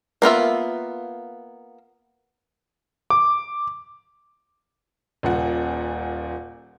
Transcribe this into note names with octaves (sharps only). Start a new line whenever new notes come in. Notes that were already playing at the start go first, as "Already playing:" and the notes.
A#3 B3 F4 E5
D6
D#1 A#2 F#5